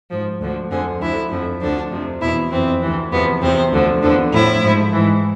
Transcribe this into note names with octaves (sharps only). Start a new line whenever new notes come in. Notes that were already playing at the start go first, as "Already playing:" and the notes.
G#2 F3
D2 D3 F3
F2 D3 F3 G#4
D2 D3 F3 E4
F2 D3 F3
D2 D3 F3 D4
F2 C3 F3
E2 B2 E4
F2 E3 C4
D2 C3 E3
E2 C3 F3 B3
E2 C3 F3 C4
D2 D3 F3
E2 D3 F3 D4
A2 F3 E4
G#2 F3
G#2 E3